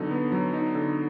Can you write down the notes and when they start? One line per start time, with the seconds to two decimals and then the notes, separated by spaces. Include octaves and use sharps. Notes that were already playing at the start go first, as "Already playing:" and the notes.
Already playing: D3 F#3 B3 D#4
0.11 B3
0.32 F#3
0.53 D#4
0.75 D3